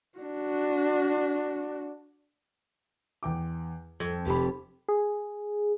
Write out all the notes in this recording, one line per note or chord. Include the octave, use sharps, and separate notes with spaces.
D4 F#4
E2 G5 D6
F2 G#6
F1 G4 B5
G#4